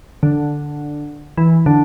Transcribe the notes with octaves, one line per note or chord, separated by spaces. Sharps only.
D3
E3
D3